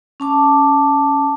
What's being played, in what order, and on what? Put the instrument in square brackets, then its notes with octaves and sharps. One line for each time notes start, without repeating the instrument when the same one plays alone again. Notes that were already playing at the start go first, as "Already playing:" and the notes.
[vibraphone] C#4 A5 D6